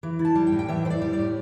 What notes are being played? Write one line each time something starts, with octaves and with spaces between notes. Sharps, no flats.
E3
E4
A5
G3
G5
A2
G5
E3 E5
E4 C5
D5
G3
D5
A2